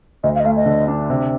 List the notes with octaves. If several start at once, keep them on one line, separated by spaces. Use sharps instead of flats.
D2 D#5
F5
D#5
A3 F5
D#5
D3
D4
C3